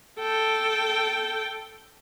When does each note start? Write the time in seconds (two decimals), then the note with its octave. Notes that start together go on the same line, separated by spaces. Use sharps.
0.19 A4 G5